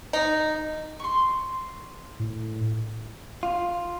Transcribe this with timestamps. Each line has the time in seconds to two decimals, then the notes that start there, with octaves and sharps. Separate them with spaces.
0.13 D#4
0.99 C6 C#6
2.20 A2
3.43 F4